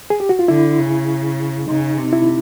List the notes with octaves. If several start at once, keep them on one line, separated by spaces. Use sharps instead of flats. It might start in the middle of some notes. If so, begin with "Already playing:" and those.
G#4
G4
F#4
F4
D3 E4
C#3
C#3 D#4
C3
E4